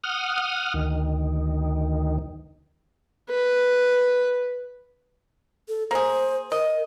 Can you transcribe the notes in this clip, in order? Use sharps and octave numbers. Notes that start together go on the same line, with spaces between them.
F#5 D#6 F6
D2 D#3
B4
A4
A#3 G#4 C5
A#4 D#5